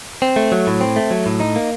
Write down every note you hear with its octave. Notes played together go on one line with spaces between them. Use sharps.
C4
A3
F#3
A2
C4
A3
F#3
A2
D#4
A#3